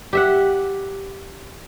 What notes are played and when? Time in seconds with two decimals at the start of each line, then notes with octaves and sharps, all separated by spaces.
0.13 G4 E5 F#5